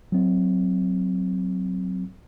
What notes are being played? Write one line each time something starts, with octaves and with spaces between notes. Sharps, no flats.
F#3 C4